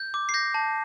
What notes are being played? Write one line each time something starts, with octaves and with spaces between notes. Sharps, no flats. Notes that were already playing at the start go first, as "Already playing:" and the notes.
Already playing: G6
D6
C7
G6 A#6
A5